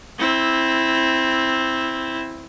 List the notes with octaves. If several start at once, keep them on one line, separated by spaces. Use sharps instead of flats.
C4 E4